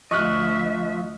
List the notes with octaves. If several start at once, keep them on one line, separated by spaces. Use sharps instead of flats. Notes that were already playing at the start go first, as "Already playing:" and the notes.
D2 F3 D#5 E5 C#6 F6 F#6